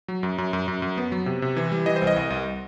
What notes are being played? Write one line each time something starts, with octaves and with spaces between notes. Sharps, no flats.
F#3
F#2
F#2
F#2
F#2
F#2
B3
F#3
C3
C3
E3
G3
E3 D#5
C5
C2
D#5
C2
C2